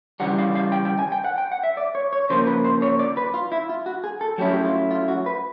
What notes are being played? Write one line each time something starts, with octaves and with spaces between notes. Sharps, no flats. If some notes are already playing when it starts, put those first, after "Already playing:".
C#3 E3 G3 F#5
F5
F5
G5
G5
G#5
G5
F#5
G5
F#5
E5
D5
C#5
C#5
C#3 F3 A#3 C5
B4
C5
C#5
D5
B4
F4
E4
F4
F#4
G#4
A4
F#3 A3 C#4 E4 G4
G4
F4
F4
F#4
B4